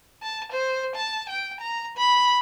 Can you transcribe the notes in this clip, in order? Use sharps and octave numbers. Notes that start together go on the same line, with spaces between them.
A5
C5
A5
G5
A#5
B5